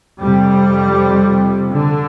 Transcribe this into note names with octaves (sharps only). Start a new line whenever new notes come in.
F2 C3 G3
D3